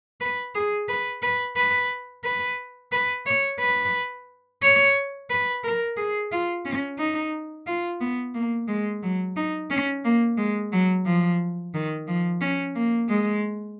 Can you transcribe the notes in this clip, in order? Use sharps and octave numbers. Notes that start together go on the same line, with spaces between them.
B4
G#4
B4
B4
B4
B4
B4
C#5
B4
C#5
B4
A#4
G#4
F4
C#4
D#4
F4
B3
A#3
G#3
F#3
D#4
C#4
A#3
G#3
F#3
F3
D#3
F3
C#4
A#3
G#3